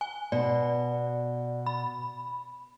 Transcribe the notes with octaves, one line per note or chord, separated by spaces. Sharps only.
G#5
B2 D5
B5